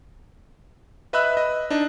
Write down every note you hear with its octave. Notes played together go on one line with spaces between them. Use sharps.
B4 D#5 E5 B5 E6 F#6
D#5
D4 D#4 D#5